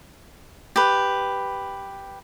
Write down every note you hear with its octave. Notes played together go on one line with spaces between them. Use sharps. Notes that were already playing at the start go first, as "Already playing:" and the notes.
G4 B4